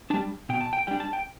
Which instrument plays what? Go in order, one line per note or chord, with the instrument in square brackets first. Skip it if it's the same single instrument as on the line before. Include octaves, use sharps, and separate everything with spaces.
[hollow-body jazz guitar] G3 D4 A5
B2 G5
A5
G5
G3 D4 G5
A5
G5